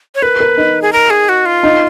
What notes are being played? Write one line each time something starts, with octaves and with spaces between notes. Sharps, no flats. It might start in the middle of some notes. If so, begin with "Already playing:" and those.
C#5
A#4 B4
A#4
D#4
G#4
A#4
G#4
F#4
F4
D#4